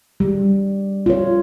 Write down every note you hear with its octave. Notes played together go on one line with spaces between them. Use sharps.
G3
F4 C#5